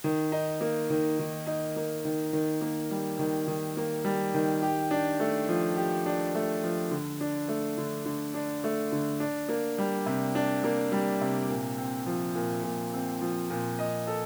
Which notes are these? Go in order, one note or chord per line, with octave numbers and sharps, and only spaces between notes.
D#3
D#4
A#3
D#3
D#3
D#4
A#3
D#3
D#3
A#3
G3
D#3
D#3
A#3
G3
D#3
G4
D4
A3
F3
G4
D4
A3
F3
D3
D4
A3
D3
D3
D4
A3
D3
D4
A#3
G3
C3
D4
A#3
G3
C3
A#2
C4
F3
A#2
A#2
C4
F3
A#2
D#5
A4